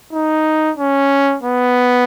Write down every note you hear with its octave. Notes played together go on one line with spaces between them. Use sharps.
D#4
C#4
B3